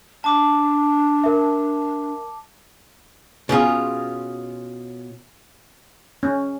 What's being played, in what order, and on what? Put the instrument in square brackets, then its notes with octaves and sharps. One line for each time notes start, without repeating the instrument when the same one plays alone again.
[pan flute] D4 [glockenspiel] A5 D6
[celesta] A#4 E5
[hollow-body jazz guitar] B2 C#4 F4 G#4
[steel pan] C#4